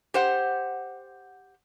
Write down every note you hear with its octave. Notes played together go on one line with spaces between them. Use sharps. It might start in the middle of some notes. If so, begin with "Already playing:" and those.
G4 C5 F#5